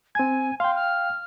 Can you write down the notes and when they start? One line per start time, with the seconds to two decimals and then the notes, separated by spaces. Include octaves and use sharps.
0.15 C4 G#5 G#6
0.60 F5 G5 C6
0.75 F6